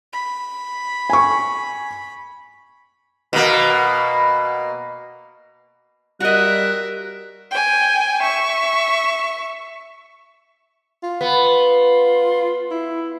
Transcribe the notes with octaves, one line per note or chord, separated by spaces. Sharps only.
B5
G#5 C#6
B2 A#3
G3 F#4 A#4 D#5 E5 F#6
G5 G#5
E5 C#6
F4
B3
E4